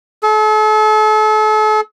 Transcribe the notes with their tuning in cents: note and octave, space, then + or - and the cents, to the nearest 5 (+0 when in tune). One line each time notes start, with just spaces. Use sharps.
A4 -40